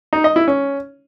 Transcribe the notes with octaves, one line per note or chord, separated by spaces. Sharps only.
D#4
D#5
E4
C#4